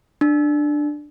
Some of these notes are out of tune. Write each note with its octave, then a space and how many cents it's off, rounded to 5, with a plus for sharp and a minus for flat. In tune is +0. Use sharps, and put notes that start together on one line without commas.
D4 +10